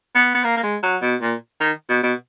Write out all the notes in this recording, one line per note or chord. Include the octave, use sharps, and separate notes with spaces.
B3
B3
A#3
A#3
G#3
F#3
B2
A#2
D#3
B2
B2